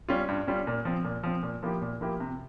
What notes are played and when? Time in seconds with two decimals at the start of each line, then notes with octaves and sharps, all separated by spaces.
0.09 G3 C#4 F4
0.28 G2
0.47 G3 C#4 F4
0.67 A#2
0.85 F3 C4
1.04 A#2
1.23 F3 C4
1.43 A#2
1.63 F3 A#3 E4 G4
1.82 A#2
2.01 F3 A#3 E4 G4
2.20 C3